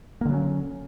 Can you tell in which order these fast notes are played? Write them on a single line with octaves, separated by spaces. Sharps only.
A#3 D3 F#3 C#4